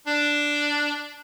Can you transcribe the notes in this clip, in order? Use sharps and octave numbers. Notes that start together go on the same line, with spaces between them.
D4